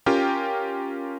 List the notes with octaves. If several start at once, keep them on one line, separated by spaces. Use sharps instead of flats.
C#4 F4 G4 A#4 G5